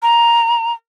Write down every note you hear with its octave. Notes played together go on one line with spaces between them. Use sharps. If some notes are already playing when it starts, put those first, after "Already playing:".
A#5